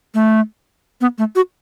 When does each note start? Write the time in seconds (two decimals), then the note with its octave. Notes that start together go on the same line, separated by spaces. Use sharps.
0.14 A3
1.01 B3
1.18 A3
1.36 F#4